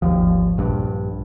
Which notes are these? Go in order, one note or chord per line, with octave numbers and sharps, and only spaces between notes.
G#1 D#2 F3
A#1 G2